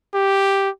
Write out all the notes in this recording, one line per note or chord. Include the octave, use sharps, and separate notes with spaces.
G4